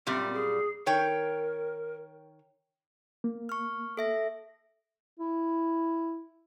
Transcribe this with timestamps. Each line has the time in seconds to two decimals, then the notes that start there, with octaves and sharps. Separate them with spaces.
0.07 F#2 A#2 G3 C4
0.33 G#4
0.86 D#3 A#4 C#5 G5
3.24 A#3
3.49 C#6 F6
3.97 A4 E5 A#6
5.19 E4